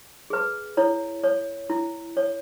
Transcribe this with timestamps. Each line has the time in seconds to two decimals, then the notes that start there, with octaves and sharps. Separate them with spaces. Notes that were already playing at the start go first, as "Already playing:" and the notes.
0.30 G#4 B4
0.77 E4 C#5
1.24 C#5
1.70 E4
2.17 C#5